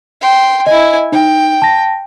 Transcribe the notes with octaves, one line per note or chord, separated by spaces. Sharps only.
G5 C6
E4 D#5 G#5
D#4 G5
A5 A#6